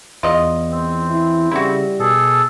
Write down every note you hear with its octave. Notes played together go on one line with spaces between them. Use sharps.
E2 F4 D#5
C4
E4
C#3 G3 E4 F#4
B2 G#4 A4